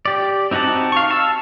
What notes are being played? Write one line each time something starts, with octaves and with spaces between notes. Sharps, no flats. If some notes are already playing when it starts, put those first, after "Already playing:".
G4 D5
C4 D#4 F#4 F#5 A5
F5 C#6
A5 E6